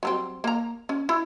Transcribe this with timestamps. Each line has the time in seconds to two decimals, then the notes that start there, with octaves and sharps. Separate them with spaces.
0.03 F#3 G3 C4
0.44 A#3 A#5
0.89 C#4
1.09 E4